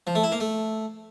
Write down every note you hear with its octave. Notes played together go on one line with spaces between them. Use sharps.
F3
A3
E4
A#3
A3